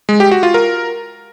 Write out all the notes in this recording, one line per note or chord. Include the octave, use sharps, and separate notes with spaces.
G#3
G4
F#4
F4
A#4